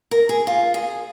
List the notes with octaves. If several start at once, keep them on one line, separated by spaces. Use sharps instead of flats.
A#4
G#4
F4
G#4